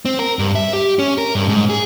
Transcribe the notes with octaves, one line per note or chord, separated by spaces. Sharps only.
C4
A#4
G2
E5
G4
C#4
A#4
G2
G#2
G#4